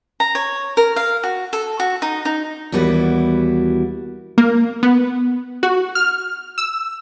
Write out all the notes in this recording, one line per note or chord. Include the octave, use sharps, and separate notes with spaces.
A#5
C#5
A#4
F5
F#4
A4
F#4
D#4
D#4
D#2 E3 G3 B3 E4 F#4
A#3
B3
F#4
F6
E6